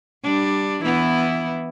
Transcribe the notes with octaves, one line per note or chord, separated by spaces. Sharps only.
G3 D4
E3 B3 E4